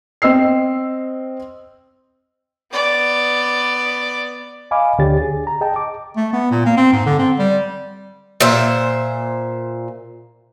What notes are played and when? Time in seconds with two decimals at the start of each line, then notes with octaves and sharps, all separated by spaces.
0.22 C4 D#5 E6 C7
2.72 B3 D5
4.71 D#5 F5 G#5 B5 D6
4.99 D2 D3 D4 G4 C#5 A6
5.22 G#4
5.47 A#5
5.61 G#4 D#5 G5 A5
5.76 D6
6.16 A3
6.33 B3
6.51 A#2
6.66 A#3
6.77 C4
6.92 G#2
7.06 D3
7.19 C4
7.39 G3
8.41 A#2 C5 E5